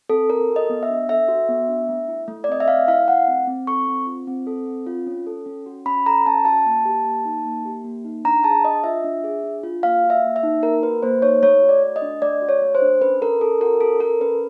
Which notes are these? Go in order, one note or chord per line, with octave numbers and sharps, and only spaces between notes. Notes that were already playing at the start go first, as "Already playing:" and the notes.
C4 A4
A4 A#4
F#4
D#5
B3
E5
D4
A4 E5
F#4
B3
D4
A3
E4
A3
D5
C4 D#5
E5
A3 F5
E4 F5
A3 F#5
C4
C4
A4 C#6
C4
F4
C4
A4
C4
F4
C#4
A4
C#4
F#4
C#4 B5
A4 A#5
C#4 A5
F#4 A5
A#3
G4
A#3
D#4
A#3
G4
A#3
D#4
D4 A#5
G#4 A5
D4 D#5
F4 E5
D4
G#4
D4
F4
A#3 F5
F#4
E5
A#3
E5
D#4
A#3 A#4
F#4 B4
A#3 C5
D#4 C#5
A3 C#5
F#4
D5
A3
D#5
D4
A3 D5
F#4
C#5
A3
C5
D4
C#4 B4
A4 A#4
C#4 A4
F#4 A#4
C#4 A4
A4 A#4
C#4 B4